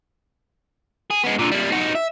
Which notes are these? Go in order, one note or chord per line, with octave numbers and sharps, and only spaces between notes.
G#4
G#3 B3
A#2 D3
G3 A#3
D#4 F#4
E5